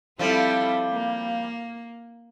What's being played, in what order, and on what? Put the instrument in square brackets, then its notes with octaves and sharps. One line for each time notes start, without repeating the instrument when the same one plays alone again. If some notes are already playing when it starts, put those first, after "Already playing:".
[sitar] F3 G3 [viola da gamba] C4 E4 A4
[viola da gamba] A#3